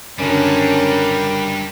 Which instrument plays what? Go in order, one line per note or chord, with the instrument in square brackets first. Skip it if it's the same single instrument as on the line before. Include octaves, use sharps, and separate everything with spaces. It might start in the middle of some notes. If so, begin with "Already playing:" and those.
[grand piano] F#1 F#2 D3 [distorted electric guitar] G3 D4 [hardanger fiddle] C#4 [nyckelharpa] A#4